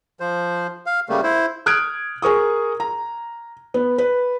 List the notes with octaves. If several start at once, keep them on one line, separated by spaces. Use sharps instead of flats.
F3 C5
F5
C#3 G3 A3 A#3
E4 C5
D#6 F6 F#6 G#6 D7
G#4 A#4 C#6 D#6
A#5
B3
B4